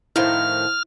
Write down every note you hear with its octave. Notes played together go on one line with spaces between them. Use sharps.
A2 D#3 F3 E4 C5 F6